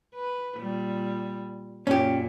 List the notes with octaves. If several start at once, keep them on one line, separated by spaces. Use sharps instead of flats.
B4
A#2 G3
F#2 A#2 C#4 G4